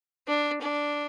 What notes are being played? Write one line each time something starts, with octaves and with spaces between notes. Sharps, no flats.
D4
D4